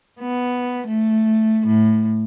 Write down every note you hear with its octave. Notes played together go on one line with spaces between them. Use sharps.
B3
A3
A2